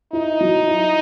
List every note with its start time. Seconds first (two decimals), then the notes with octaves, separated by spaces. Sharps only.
0.13 D#4 E4
0.41 F#3
0.68 E4